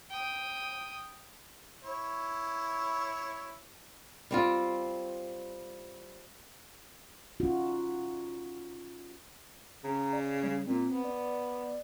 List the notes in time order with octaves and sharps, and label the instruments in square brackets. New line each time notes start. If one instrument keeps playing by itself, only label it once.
[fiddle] G5 D#6
[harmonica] E4 C#5
[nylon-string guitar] G3 C4 F4
[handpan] C#4 D#4 F4 F#4
[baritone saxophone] C#3 [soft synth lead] A#5
[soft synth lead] D5
G3
[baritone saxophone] A#2 [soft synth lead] C4
[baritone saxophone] B3
[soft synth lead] D5